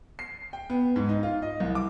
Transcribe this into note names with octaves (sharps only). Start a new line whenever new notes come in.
C7
G5
B3
G#2
D#4
F4
D#5
C2
D6